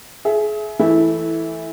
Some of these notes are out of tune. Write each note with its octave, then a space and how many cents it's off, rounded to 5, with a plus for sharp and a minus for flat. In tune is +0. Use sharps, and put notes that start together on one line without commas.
G#4 +30 E5 +5
E3 +0 A3 +0 E4 -15